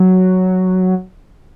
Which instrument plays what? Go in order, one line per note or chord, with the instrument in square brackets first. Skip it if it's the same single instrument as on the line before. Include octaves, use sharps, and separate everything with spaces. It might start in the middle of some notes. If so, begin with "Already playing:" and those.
Already playing: [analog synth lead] F#3